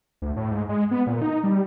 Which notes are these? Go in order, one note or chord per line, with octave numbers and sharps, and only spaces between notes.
D2
A2
G#2
G#3
B3
A#2
D#4
G3